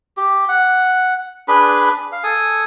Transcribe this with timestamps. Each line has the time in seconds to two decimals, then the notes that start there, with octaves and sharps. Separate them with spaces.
0.17 G4
0.49 F#5
1.48 D4 G#4 B4 B5
2.12 F5
2.24 A4 G#5 D#6